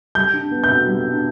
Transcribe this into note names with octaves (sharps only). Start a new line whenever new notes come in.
G3 G6
D4
B3
G6
B2
G3
D4